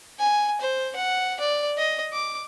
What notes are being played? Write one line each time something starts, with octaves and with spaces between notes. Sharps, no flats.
G#5
C5
F#5
D5
D#5
D6